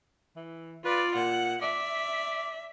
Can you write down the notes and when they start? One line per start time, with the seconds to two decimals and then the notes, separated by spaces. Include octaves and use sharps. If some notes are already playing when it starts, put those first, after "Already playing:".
0.36 E3
0.85 F4 B4 D5
1.15 A#2 F#5
1.62 D5 E5